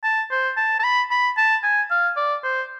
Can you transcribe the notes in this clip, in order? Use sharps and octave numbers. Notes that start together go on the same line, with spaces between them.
A5
C5
A5
A5
B5
B5
A5
G#5
F5
D5
C5